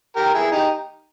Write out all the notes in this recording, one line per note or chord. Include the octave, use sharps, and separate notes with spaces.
G4 A#4
E4 G#4
D#4 G4